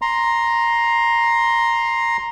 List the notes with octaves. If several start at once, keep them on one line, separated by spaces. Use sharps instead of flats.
A#5 C6